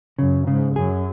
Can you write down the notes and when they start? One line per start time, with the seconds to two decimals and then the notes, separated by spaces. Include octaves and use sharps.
0.19 F#2 C#3
0.47 G#2 C#3
0.75 F#2 G#4